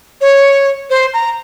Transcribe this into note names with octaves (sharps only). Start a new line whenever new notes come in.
C#5
C5
A#5